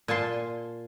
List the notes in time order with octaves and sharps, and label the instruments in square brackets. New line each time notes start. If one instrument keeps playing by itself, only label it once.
[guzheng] A#2 G#5 A5 C6